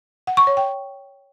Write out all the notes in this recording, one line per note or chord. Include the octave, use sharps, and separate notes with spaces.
F#5
C#6
C#5
G5